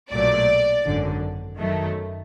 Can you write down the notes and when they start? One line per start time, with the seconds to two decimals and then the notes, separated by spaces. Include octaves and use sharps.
0.11 B1 A#2 F#3 A3 D5
0.85 G#1 F#2 D3
1.59 F#2 D#3 F#3 A3